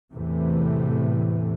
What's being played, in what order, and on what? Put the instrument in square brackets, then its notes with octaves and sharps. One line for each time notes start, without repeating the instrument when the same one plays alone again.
[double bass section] E2 A2 C3 E3 A3